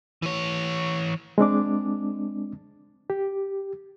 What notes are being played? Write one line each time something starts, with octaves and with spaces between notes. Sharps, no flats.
E3 C#5
G#3 C4 D4 D6
G4